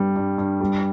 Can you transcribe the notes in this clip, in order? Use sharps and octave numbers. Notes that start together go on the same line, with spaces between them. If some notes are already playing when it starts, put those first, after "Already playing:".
Already playing: G2 G3
G2
G2
G3